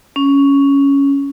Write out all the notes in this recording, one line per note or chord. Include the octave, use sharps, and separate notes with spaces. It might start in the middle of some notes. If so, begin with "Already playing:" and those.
C#4